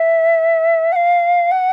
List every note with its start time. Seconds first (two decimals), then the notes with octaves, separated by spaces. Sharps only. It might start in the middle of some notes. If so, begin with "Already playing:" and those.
Already playing: E5
0.92 F#5
0.95 F5
1.51 F#5